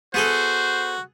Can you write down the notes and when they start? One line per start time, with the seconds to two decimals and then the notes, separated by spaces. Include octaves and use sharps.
0.14 B3 F#4 G#4 A4 C5